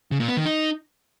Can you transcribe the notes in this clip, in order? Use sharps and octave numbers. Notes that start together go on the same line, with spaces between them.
C#3
A#2
B3
D#3
D#4